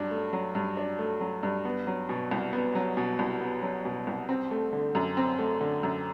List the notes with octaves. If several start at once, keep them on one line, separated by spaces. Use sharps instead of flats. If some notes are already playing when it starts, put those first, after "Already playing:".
Already playing: G2 F#3 D4
A3
F#3
G2
D4
A3
F#3
G2
B3
F#3
B2
C2
B3
F#3
B2
C2
B3
F#3
B2
C2
C4
A3
D3
F#2
C4
A3
D3
F#2